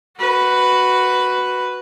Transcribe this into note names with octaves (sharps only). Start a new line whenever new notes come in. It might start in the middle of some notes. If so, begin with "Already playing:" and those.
F#4 B4